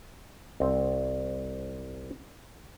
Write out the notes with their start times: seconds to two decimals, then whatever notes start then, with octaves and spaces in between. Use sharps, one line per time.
0.60 C2 C4